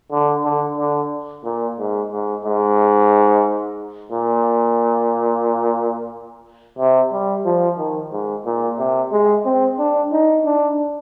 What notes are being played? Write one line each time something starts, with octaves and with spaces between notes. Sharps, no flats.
D3
D3
D3
A#2
G#2
G#2
G#2
A#2
C3
G3
F3
D#3
G#2
A#2
C3
G#3
C4
D4
D#4
D4